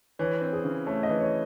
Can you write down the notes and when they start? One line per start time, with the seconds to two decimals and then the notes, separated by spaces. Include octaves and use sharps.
0.19 E3 C#5
0.41 C4
0.53 G#4
0.64 C#3
0.86 A3 C#5
1.03 D#5
1.09 E3
1.20 C#5